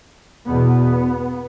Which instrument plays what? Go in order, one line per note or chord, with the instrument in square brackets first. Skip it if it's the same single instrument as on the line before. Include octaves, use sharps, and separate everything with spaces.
[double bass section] E2 B2 B3